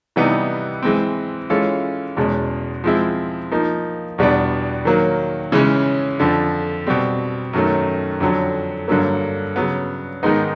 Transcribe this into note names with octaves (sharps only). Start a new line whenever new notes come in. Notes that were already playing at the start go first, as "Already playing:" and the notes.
C3 E3 G3 B3 D#4
E3 G#3 C4
E3 G#3 C#4 F4 A4
E2 B2 G#3 C#4
F3 G#3 C4 E4
F3 A#3 D#4
E2 B2 G3 B3 D4
D#3 F#3 A#3
C#3 E3 G#3 C#4
F2 D3 F3
B2 G3 C4
F#2 D#3 F#3 A3
F2 D3 F#3
G2 D3 F#3 A#3
C#3 F#3 B3
G#2 D#3 G#3 B3 D#4